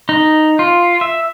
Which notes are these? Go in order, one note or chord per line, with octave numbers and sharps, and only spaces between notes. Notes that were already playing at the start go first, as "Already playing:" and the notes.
D#4
F4
E5